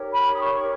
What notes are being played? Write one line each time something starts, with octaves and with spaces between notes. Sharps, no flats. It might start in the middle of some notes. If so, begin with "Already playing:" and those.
Already playing: D#4 G4 A#4 C#5
B5
D#6
C#6